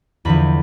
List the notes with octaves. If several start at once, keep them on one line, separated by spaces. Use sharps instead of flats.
E2 D3 F3 B5